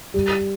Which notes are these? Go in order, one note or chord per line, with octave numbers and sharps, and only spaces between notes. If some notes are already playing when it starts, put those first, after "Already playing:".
G3